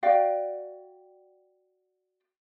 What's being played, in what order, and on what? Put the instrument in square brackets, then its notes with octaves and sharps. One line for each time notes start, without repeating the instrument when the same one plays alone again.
[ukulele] F#4 D5 F5 G5